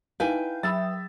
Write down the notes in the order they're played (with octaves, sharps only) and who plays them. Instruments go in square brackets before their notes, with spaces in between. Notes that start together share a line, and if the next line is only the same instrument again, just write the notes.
[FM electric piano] D#4 F5 [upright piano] E4 [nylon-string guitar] B4 G5 G#5 [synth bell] G6
[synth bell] F#3 D#6 [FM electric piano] E5 [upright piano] B5 E6 A6